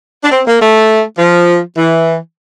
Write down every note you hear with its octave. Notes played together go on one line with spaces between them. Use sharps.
D4
C4
A#3
A3
F3
E3